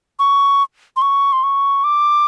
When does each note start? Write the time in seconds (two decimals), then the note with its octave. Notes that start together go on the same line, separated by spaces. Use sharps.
0.19 C#6
0.96 C6
1.02 C#6
1.33 C6
1.43 C#6
1.84 D6